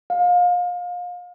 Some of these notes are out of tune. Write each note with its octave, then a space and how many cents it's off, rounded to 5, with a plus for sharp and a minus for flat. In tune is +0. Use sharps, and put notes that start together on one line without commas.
F5 +30